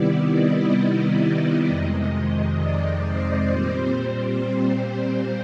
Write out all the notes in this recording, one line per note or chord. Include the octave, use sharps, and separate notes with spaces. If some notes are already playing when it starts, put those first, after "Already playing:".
Already playing: C3 D#3 G3 B3 E4 D5
D#5
F2 C3 D#3 G#3
D5
C5
A#2 G3 C4